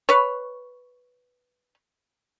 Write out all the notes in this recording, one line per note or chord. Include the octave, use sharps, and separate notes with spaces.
B4 C#5